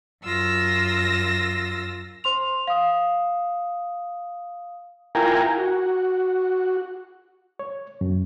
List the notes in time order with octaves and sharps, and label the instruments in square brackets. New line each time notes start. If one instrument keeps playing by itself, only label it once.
[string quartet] F#2 F4 E6 A#6
[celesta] C5 C6 F7
F5 D#6
[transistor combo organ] E4 F4 A#4 G5 G#5 A#5
F#4
[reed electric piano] C#5
F#2